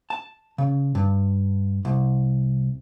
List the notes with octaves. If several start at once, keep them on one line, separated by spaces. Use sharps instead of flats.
A5
C#3
G2
C2